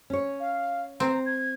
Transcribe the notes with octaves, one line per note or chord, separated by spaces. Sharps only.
C#4 C#5
F5
C4 A#5
G#6